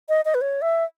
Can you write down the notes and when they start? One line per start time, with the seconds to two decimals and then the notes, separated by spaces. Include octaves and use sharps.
0.09 D#5
0.25 D#5
0.35 B4
0.41 C#5
0.62 E5